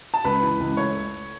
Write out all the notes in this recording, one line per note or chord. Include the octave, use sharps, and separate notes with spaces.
A5
C#2 B4 B5
E3
C#2
A3 C#5 C#6